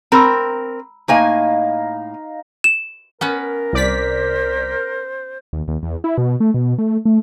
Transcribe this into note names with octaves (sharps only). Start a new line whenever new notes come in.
C4 A#4 A#5 B5 E6
A2 A#3 D#4 F5 G#5
E7
B3 C#4 A#4 B4
C2 C5 D5 B6
D#2
D#2
E2
E4
B2
A3
B2
A3
A3